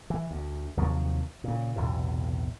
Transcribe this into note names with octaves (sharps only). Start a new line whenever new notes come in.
E3
D2
D#2 C3 F3 F#3
A#2 C#3
B1 E2 A2 C3